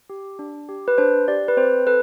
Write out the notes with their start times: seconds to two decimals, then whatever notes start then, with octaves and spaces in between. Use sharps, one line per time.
0.10 G4
0.39 D4
0.69 G4
0.88 B4
0.98 D4 C5
1.28 G4 D5
1.48 B4
1.57 C4 C5
1.87 A4 B4